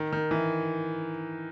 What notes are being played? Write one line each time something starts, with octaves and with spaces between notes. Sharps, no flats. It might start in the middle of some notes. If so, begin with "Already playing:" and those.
Already playing: D#3
D#3
E3